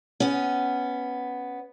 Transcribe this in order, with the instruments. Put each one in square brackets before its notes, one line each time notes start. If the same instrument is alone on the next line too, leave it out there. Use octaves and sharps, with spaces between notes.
[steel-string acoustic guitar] B3 C#4